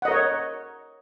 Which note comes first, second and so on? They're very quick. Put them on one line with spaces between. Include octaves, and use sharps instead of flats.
F#5 D#5 A#4 C#5